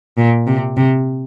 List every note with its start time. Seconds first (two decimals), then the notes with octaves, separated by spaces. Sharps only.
0.18 A#2
0.47 C3
0.77 C3